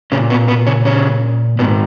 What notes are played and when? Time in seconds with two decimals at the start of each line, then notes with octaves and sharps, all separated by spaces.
0.12 A#2 C#3 C#4
0.30 B2 B3
0.48 B2 B3
0.67 C#3 C#4
0.85 C#3 C#4
1.59 G#2 B2 D#3 B3